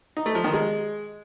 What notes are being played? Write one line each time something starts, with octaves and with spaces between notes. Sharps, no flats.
D#4
A3
F3
D#3
G#3